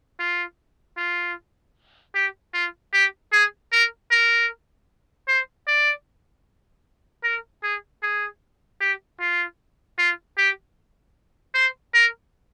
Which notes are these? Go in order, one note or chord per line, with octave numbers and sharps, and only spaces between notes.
F4
F4
G4
F4
G4
G#4
A#4
A#4
C5
D5
A#4
G#4
G#4
G4
F4
F4
G4
C5
A#4